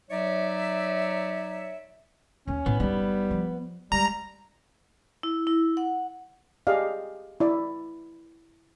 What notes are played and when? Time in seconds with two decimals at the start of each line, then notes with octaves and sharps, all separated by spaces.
0.10 F#3 D#4 C#5 D5 E5
2.48 D#2 A#3 C#4
2.66 A2 B3
2.80 F#1 G3 D#4
3.31 F3
3.92 G3 G#3 A#5
5.23 E4
5.47 E4
5.77 F#5
6.67 G4 G#4 D5 D#5 F5
7.40 E4 D5